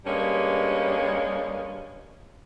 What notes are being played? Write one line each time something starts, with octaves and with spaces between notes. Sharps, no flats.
G2 G3 G#3 A#3 C#4